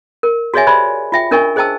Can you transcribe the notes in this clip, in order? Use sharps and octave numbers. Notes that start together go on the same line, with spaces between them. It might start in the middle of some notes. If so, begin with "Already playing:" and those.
A#4
F#4 G#4 C#5 D#5 E5 G#5
G4 C5 D5 B5
F4 E5 G5
C#4 D4 A#4 D#5 G#5 C#6
G#4 C5 D#5 G5 A5 E6